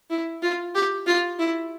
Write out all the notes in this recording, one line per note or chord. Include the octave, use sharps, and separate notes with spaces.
E4
F4
G4
F4
E4